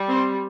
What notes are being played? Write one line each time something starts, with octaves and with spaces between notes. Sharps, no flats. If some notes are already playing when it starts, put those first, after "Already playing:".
Already playing: G3
C4 C5